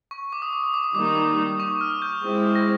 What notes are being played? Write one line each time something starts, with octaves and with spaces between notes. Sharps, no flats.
C#6
D6
D#6
D6
D#6
D6
D#6
D#3 G3 A#3 D#4 D6
D#6
D6
C#6
F6
G6
G#3 C4 E4
A#6